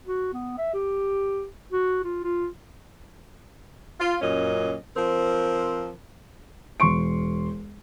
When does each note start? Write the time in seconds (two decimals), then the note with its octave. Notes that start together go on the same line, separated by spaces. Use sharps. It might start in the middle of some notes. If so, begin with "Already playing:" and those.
0.06 F#4
0.33 B3
0.58 E5
0.74 G4
1.72 F#4
2.04 F4
2.24 F4
4.00 F4
4.21 F#2 A#2 C#4 D#5
4.96 F3 C4 A#4
6.80 E1 C6 C#6 D7